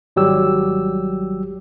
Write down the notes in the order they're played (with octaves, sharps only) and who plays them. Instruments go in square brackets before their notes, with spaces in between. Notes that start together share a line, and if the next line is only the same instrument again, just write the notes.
[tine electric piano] G#1 F#3 G3 G4 E6